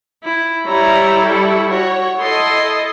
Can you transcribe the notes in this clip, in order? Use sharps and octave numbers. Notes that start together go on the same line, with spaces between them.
E4
G3 E4 C#5 A#5
A4 C#6
F#4 C#5
E4 A4 D#5 C6